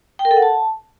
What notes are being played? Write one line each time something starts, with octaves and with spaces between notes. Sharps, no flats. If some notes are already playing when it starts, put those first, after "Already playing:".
G5
A#4
A4
F#5
A5